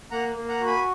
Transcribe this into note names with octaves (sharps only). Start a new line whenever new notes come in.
A#3 F#5 A#5
A#3
F#5 A#5
F#4
G#5 B5